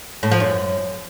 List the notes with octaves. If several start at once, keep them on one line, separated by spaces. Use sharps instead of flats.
A2
F3
F#2